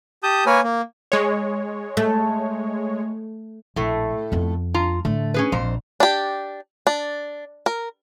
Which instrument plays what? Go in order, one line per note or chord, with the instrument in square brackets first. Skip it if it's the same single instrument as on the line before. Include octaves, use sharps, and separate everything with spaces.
[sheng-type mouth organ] G4 A5 D#6 G6
A#3 A#4 B4 C#5 G#5
A#3
[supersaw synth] G#3 C#5
[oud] A3
[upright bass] A#1 [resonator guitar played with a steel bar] A2 A3
[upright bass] F2 B3
[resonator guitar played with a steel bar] F4 A#5
[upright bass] A2 D3 [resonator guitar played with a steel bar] A3
[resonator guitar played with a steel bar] C#4 G#4 B4
[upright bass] A#1 [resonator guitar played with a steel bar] F2 C5 A#5
[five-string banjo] D4 G4
D4
A#4